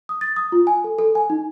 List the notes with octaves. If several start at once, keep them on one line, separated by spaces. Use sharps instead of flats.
D#6
A6
D#6
F4
G#5
A4
A4
G#5
D#4